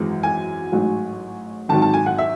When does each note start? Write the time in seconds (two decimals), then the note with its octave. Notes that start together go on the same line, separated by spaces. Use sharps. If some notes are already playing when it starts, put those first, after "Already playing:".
Already playing: G#1 F#2 E3 G#3
0.23 G#5
0.72 A1 G#2 F#3
1.69 G#1 G#2 D#3 F#3 A5
1.82 A5
1.94 G#5
2.06 F#5
2.18 E5